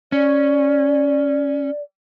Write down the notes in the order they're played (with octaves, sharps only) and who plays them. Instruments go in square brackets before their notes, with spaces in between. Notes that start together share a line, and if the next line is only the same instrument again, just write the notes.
[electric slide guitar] C#4 [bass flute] D5